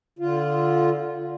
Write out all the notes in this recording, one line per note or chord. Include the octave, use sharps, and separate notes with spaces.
D3 F4